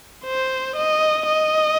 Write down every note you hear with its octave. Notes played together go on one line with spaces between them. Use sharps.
C5
D#5
D#5